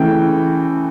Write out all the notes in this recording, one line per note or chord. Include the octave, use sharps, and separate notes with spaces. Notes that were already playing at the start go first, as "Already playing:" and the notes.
Already playing: C#3 E3 A3 G5